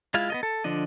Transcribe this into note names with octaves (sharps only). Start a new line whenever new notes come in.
G#3 E4 F4 F5
B3 A4 D#5
A4
D3 F3 D4 D#5